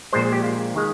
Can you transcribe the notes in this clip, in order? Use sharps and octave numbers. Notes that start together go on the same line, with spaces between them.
A#1 A#2 G#3 C5
G4
F4
D#3 G#3